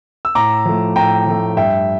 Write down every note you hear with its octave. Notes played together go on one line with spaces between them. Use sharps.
E6
A2 A#5 D6
F3 A3
A2 G5 A#5
F3 A3
G2 E5 G5